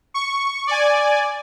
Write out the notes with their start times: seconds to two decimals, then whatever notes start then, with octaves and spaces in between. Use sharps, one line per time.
0.14 C#6
0.67 D5 G#5